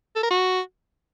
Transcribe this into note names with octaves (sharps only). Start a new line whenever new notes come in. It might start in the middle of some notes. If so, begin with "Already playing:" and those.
A4
A#4
F#4